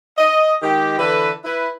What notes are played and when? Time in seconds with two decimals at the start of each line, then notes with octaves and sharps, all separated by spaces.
0.18 D#5
0.63 D#3 G#3 G4
0.98 D3 E3 A4 B4
1.44 E4 B4